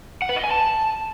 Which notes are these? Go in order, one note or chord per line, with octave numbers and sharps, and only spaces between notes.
F#5
B4
D#5
G#5
A5